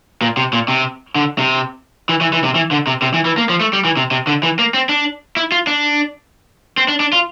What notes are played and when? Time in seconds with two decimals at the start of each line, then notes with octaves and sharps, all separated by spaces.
0.22 A#2
0.37 C3
0.53 A#2
0.68 C3
1.15 D3
1.38 C3
2.09 E3
2.21 E3
2.33 E3
2.44 C3
2.55 E3
2.71 D3
2.87 C3
3.02 C3
3.14 E3
3.25 E3
3.38 A#3
3.49 F3
3.60 A3
3.73 G3
3.85 E3
3.97 C3
4.11 C3
4.27 D3
4.43 E3
4.59 A#3
4.74 C4
4.89 D4
5.37 E4
5.52 F4
5.67 D4
6.77 C4
6.88 D4
7.00 D4
7.13 F4